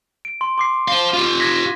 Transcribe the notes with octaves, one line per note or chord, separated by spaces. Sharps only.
D7
C6
C6 D6 C7
C5 F5 G7
F4 G4
G#6 A#6 B6